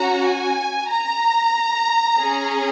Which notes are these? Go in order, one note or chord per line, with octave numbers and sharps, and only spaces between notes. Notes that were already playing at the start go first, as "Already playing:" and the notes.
Already playing: C#4 F#4 A#5
G#5
A#5
C#4 G#4